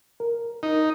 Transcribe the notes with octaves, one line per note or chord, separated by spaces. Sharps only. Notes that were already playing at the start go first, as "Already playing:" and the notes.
A#4
D#4